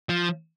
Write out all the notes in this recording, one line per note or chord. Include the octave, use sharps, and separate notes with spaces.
F3